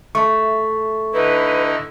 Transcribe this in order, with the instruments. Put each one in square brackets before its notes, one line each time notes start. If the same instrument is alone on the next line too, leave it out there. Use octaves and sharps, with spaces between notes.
[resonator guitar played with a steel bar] A3 [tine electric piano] C#6
[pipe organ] D3 D#4 E4 [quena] B4